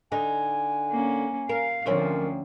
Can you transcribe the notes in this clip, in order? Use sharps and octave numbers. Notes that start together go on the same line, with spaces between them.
D3 D#4 G#5
A#3 C#4
A#4 F5
D2 D3 F3 C4 C#4 A#4